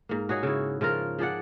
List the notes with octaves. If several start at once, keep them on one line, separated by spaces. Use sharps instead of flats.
G#2 A#3
F#4 G#4 C#5 D#5
C#3 E4
C#3 F3 F4 A#4
F3 G#4 D5 F#5